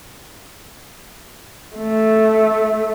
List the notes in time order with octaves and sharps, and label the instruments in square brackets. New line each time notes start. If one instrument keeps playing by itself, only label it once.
[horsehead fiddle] A3